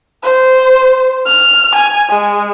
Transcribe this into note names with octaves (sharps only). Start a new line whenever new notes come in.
C5
F6
G#5
G#3